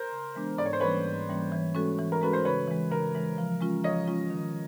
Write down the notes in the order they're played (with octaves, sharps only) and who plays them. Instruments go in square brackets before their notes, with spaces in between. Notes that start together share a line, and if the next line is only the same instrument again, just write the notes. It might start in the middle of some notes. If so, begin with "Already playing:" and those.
Already playing: [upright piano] A#4 C5
[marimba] C#3
E3 G#3 B3 D4
[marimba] G#2 [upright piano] D5
[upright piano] C#5
C5
[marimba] E3 G3 A#3 C#4 [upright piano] B4 C#5
[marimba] G#2
E3 G3 A#3 C#4
E3
G#3 C#4 F#4 A4
E3
[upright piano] A#4
[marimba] G#3 C#4 F#4 A4 [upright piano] B4
[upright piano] C5
[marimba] C#3 [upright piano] B4 C#5
[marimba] E3 G#3
[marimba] C#3 [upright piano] A#4
[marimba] E3 G#3
F3
G#3 C#4 F4
[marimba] F3 [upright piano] C#5 D#5
[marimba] G#3 C#4 F4
D#3